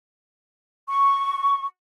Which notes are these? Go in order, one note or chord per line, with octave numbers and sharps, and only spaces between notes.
C#6